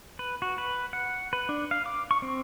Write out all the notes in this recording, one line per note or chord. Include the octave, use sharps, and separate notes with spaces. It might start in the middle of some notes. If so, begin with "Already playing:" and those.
B4
F#4
B4
F#5
B4
D4
F5
D6
C#6
C4